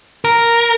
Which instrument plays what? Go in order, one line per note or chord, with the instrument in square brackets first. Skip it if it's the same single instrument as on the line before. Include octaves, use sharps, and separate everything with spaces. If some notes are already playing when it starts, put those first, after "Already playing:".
[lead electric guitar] A#4